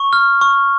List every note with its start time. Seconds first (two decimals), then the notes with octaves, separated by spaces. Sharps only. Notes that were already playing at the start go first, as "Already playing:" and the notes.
Already playing: C#6
0.13 F6
0.41 C#6